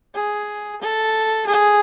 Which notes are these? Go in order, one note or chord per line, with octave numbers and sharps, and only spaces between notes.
G#4
A4
G#4